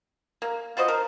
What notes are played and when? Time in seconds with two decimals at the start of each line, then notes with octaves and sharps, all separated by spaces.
0.42 A#3
0.77 F4 F#4 C5 D#5
0.88 A#4